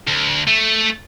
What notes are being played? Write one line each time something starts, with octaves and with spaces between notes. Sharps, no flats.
D2
A3